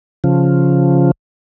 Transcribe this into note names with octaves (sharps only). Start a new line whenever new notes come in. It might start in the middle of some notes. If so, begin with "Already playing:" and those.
C#3 F3